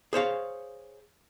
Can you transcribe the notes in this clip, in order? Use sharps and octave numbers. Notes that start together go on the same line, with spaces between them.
G#4 C5 C#5 F5